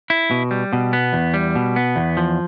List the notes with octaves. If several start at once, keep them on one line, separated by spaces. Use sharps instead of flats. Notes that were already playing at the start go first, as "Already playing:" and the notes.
E4
B2
G3
B2
B3
E2
G3
B2
B3
E2
F3